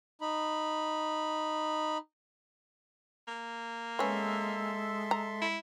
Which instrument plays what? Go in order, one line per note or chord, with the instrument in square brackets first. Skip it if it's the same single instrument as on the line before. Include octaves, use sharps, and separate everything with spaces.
[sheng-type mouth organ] D#4 B5
[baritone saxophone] A#3
[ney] G#3 [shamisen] B3 C#4 [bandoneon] A4 E5 C6
[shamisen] A#5
[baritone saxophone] E4